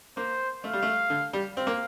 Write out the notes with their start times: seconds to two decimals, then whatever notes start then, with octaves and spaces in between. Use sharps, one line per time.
0.17 A#3 C5
0.64 A3 F5
0.73 G3
0.83 A3
1.10 D3
1.33 G3
1.56 C4 F5
1.67 A#3